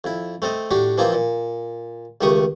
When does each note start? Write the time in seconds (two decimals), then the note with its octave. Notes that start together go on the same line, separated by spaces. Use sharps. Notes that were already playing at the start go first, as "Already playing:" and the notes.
0.04 F2 E4
0.42 A3 C4 A4 D#5
0.71 A2 D4 F#4 G4
0.98 E3 F3 A#3 C4 D#4 F4
1.13 A#2
2.21 C#2 D#3 A3 G4 C#6 D#6